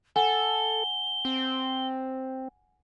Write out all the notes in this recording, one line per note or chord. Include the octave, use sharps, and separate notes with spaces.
A4 F#5 G#5 G7
C4